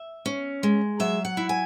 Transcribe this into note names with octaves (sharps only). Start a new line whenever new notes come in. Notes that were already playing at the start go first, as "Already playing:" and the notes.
Already playing: E5
C#4
G#3
F#3 E5
F#5
E4
G#5